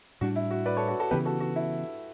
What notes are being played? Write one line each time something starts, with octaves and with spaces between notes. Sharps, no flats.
A2 G3 D4 F#4
E4
F#4
B4 D5
A4 C#5
F#4 A4
F#4 A4
C#3 E3 B3 G4 B4
F#4 A4
F#4
E4